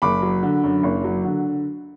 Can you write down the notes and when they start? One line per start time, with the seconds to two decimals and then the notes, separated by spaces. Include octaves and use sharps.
0.02 F#1 B5 D6
0.22 F#3
0.43 D3
0.64 F#2
0.83 F#1
1.04 F#3
1.25 D3